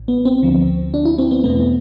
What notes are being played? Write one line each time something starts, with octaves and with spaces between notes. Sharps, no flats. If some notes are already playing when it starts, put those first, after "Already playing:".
Already playing: A1 A2
B3
C4
D2 D3 F3
D4
E4
C4
B3
E2 B2 A3 B3